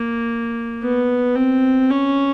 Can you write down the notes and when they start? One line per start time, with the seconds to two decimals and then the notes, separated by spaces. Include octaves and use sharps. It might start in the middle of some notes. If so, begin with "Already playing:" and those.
Already playing: A#3
0.82 B3
1.36 C4
1.90 C#4